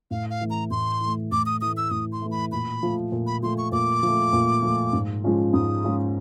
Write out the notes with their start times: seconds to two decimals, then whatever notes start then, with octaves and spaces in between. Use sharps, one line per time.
0.11 A2 F5
0.30 F5
0.41 E3 A3
0.50 A#5
0.71 A2 C6
1.01 E3 A3
1.31 A2 D6
1.46 D#6
1.61 E3 A3 D#6
1.77 E6
1.91 A2 D#6
2.12 C6
2.21 E3 A3
2.31 B5
2.52 A#2 B5
2.83 F3 A3
3.12 A#2
3.27 B5
3.43 F3 A3 C6
3.58 C#6
3.72 A#2 D6
4.03 F3 A3
4.33 A#2
4.63 F3 A3
4.93 G#2
5.24 F3 G#3 C#4 F4
5.53 G#2 D#6
5.84 F3 G#3 C#4 F4